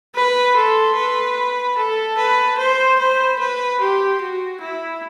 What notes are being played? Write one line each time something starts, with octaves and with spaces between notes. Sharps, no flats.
B4 B5
A4 C6
B4
B5
A4 A5
B4
C5 C6
C5 B5
B4
G4 C6
F#4
E4